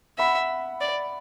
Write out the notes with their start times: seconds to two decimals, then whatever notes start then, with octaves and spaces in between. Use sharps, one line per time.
0.18 E5 F#5 B5
0.81 D5